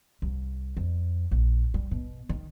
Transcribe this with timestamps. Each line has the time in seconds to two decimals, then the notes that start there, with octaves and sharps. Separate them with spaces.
0.22 C2
0.77 F2
1.31 A#1
1.74 G3
1.91 B2
2.29 D#3